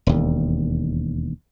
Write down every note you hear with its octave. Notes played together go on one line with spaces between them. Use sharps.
E1 D#2